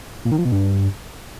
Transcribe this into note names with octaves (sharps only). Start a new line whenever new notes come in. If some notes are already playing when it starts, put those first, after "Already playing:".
A#2
D#3
F3
B2
G2